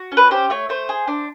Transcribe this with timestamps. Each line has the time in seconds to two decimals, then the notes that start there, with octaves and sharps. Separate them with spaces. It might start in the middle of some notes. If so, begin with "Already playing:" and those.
Already playing: F#4
0.12 C#4
0.17 B4
0.31 G4 C5
0.50 A3 C#5
0.69 A3 C5
0.89 G#4
1.08 D4